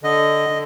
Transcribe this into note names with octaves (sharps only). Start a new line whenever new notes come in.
D3 D#5
D3